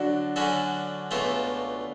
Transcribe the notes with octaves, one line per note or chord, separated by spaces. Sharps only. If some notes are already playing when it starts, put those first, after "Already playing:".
Already playing: D3 F#3 D4 F#4 A4
D3 F#3 C#4 F#4 A4
C#2 B2 A3 F4 A4